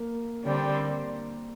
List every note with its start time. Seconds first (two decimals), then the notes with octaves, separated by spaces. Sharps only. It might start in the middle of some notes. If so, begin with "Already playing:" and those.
Already playing: A#3
0.44 D3 G3 C4